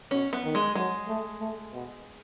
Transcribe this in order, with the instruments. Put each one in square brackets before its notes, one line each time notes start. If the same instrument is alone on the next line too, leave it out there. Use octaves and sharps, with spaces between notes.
[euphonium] B2 [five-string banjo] C#4
[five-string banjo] B3
[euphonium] D#3
[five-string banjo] G#3
[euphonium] F#3 [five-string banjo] G#3
[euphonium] A3
A3
B2